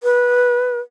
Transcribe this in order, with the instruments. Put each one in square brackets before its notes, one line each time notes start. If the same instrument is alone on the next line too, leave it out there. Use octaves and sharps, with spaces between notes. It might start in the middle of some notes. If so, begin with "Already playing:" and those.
[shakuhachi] B4